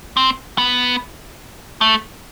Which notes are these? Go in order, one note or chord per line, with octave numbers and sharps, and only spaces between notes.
C4
B3
A3